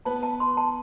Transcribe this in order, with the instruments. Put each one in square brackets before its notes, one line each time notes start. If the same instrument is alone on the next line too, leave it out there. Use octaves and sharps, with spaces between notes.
[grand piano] B3 B4 [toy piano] A5
[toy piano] A5
C6
A5